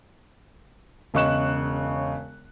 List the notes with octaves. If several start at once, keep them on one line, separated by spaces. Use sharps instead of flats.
E1 C#3 D#5 C#6 F#6 E7